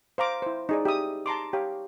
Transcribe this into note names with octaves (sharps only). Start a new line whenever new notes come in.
C5 F5 A#5 D6
E4 C5
D#4 G#4 D5
G4 E5 D#6
A5 A#5 C6 D6
G4 C#5 F5